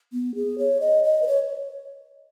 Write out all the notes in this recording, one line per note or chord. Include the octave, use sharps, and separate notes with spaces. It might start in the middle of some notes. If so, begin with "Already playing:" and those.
B3
G#4
C#5
D#5
D#5
B4
C#5